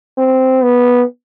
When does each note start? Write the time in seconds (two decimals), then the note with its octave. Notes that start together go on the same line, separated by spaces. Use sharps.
0.18 C4
0.63 B3